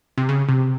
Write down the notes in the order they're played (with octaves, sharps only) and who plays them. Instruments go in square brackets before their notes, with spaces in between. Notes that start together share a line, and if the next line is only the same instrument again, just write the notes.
[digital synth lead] C3
C#3
C3